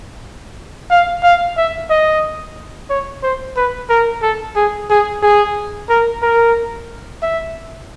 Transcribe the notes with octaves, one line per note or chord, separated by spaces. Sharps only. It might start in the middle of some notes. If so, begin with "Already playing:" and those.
F5
F5
E5
D#5
C#5
C5
B4
A#4
A4
G#4
G#4
G#4
A#4
A#4
E5